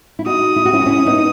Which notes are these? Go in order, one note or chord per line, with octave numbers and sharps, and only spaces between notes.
E4
D#4 F#4 D#6
E4
F#4
C#4 E4
F#4
C#4 E4
B3 D#4